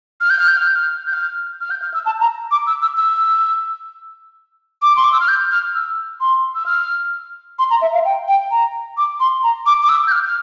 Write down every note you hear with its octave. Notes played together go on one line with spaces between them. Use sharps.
F6
G6
F6
G6
F6
G6
F6
G6
F6
F6
G6
F6
E6
A5
A#5
D6
E6
E6
E6
D6
C6
D6
E6
F6
G6
F6
E6
C6
E6
F6
C6
A#5
E5
F5
G5
G5
A#5
D6
C6
A#5
D6
D6
E6
G6
F6
F6